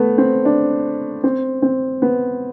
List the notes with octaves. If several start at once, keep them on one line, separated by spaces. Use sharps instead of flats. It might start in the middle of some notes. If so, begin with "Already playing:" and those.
Already playing: A3 B3
C4
D4
C4
C4
B3